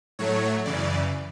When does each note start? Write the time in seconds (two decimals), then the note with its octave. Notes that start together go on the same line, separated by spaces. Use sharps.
0.19 A2 F#3 A3 C#5
0.65 F#2 C#3 E3 D5